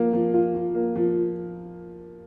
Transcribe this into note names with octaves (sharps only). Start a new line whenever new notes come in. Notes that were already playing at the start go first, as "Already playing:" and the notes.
Already playing: F3 A#3
F3
F4
F3
A#3
F3